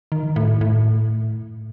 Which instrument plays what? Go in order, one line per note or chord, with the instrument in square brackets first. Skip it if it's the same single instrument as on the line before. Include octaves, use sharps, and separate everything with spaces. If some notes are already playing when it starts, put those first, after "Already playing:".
[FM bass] D#3
A2
A2